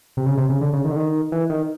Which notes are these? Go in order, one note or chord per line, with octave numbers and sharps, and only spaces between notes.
C3
C#3
C3
C#3
D3
C#3
D#3
D3
D#3
E3
D#3